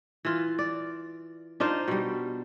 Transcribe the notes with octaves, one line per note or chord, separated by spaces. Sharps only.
E3 F4
D5
D4 D#4 F4 C5
B2 G3